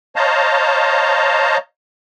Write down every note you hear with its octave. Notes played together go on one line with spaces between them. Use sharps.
C5 C#5 D#5 F5 A5 A#5